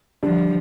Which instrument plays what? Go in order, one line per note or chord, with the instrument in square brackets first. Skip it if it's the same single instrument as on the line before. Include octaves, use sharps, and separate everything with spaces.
[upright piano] D3 G3 D4 [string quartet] F3